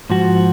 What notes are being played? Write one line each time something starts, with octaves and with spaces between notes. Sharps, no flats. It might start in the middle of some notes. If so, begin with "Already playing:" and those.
G#2 F3 F#4